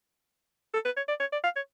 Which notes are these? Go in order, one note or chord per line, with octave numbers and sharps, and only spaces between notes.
A4
B4
C#5
D5
C#5
D5
F5
C#5